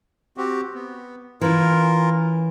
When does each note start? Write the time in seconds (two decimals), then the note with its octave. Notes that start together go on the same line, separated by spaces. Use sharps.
0.37 C4 F#4 G4
0.74 B3
1.41 E3 C#4 F4 A#4